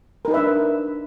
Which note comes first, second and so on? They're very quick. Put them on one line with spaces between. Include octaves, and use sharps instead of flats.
A#4 D#4 B4 E5 D4